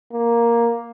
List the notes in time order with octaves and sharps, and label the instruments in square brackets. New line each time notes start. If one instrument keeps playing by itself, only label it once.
[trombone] A#3